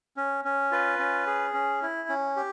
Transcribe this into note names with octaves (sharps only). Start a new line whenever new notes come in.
C#4
C#4
F4 B4
C#4
G#4
C#4
E4
C#4
G4